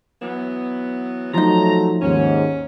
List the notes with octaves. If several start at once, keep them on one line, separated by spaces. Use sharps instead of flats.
E3 F#3 B3
F3 F#3 A3 D#4 A#5
D#2 G#2 C#4